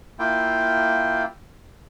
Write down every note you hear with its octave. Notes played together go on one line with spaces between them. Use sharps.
A#3 E4 F4 G5